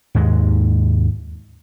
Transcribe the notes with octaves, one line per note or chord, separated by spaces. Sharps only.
D#2 G#2 G#3